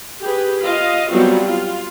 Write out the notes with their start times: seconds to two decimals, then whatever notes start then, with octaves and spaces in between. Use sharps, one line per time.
0.20 G4 G#4 B4
0.65 F4 D#5 F5
1.10 F#3 G3 B3 C4 F4 F#4
1.46 F4